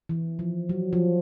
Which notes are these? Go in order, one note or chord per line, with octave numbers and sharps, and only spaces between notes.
E3
F3
F#3
F3